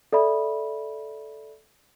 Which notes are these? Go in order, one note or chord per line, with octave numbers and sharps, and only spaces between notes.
A4 D5 E5 B5